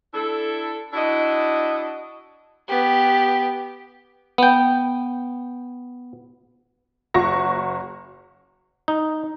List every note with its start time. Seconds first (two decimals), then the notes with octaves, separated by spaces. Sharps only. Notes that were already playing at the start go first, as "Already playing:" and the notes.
0.14 D4 E4 A4
0.94 D4 E4 F#4 D#5
2.68 B3 G4
4.38 B3 G5
7.14 F#1 F#4 C#6 A#6
8.88 D#4